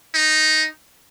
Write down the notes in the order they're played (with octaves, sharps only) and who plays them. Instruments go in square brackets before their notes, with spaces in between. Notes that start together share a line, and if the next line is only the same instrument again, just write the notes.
[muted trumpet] D#4